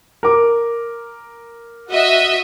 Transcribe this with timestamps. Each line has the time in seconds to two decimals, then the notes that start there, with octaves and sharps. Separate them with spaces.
0.23 A#4 D6
1.90 F#4 D#5 E5